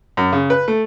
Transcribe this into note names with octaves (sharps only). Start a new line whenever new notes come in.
F#2
C#3
B4
A3